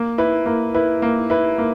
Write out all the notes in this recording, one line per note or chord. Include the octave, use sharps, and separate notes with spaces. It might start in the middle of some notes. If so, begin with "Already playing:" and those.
Already playing: A#3
E4 B4
A#3
E4 B4
A#3
E4 B4
A#3